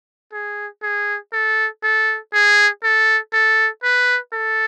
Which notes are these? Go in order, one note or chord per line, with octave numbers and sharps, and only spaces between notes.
G#4
G#4
A4
A4
G#4
A4
A4
B4
A4